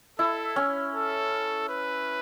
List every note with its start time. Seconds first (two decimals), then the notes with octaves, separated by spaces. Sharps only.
0.19 E4 A4
0.56 C#4
0.94 A4
1.69 B4